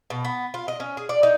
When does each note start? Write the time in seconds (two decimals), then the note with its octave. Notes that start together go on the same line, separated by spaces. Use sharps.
0.10 B2
0.25 B3
0.54 F4
0.68 D#5
0.80 C#4
0.97 G#4
1.09 D5
1.23 D#4